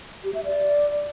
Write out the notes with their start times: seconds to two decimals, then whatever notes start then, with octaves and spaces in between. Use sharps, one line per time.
0.24 G4
0.34 E5
0.45 D5